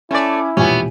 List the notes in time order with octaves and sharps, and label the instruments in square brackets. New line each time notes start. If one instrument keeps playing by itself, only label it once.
[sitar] A3 D5 [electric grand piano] C#4 G#5 D6 [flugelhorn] E4
[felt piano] E1 A#1 G#5 [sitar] B3 C#4 [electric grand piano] G4